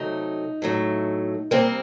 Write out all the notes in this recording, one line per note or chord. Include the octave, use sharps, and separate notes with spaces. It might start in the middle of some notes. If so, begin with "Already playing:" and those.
Already playing: C3 F#3 A3 D#4
A2 F#3 A3
C3 G3 A#3 C4